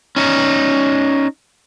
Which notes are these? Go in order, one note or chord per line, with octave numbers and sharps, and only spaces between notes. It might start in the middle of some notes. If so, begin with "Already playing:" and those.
C#4 D#4